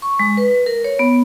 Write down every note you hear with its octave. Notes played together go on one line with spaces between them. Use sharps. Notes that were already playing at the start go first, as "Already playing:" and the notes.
C#6
G#3
B4
A#4
C#5
B3